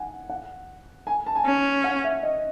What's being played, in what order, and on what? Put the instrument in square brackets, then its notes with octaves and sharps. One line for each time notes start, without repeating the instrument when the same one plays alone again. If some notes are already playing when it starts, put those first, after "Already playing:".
Already playing: [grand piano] F#5 G#5
F#5
G#5
A5
G#5
[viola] C#4
[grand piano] F#5
E5
D#5